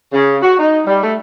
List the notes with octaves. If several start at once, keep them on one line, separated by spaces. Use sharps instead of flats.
C#3
F#4
D#4
G3
A3